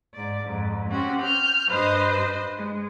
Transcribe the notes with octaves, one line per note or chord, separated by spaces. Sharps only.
G#2 D5
F2 G#2
C4 C#4 F#4 G4
F6 G6
G2 B4 C5 D#5
G#3